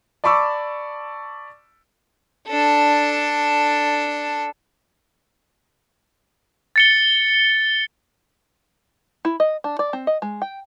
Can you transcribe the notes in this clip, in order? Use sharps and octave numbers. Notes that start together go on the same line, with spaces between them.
D5 A5 B5 C#6 D6 E6
D4 A4
A6 C#7 G7
E4
D#5
D4
D5
C4
D#5
G#3
G5